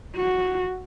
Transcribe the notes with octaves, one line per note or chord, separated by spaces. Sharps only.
F#4